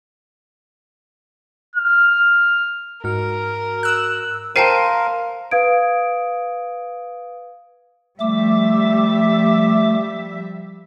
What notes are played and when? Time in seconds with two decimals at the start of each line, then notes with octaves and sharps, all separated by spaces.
1.76 F6
3.04 G#2 F#4 A#4 F6
3.83 E6 F#6
4.56 A#4 C5 F5 G5 A5 C6 C7 D#7
5.51 B4 F5 D#6 G#6 D7
8.20 F3 G3 A3 E5 D6